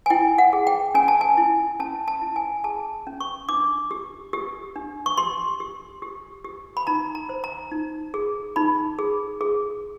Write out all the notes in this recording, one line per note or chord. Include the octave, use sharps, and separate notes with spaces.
G#5
E4 G5
F#5
G#4
G5
C#4 G#5
A5
G#5
E4
C#4 A5
A5
E4
G#5
G#4 A5
C#4
C#6
D4 D6
G4
G4
D4
C#6
G4 C6
G4
G4
G4
B5
D#4 A#5
A#5
C5
A#5
D#4
G#4
D#4 B5
G#4
G#4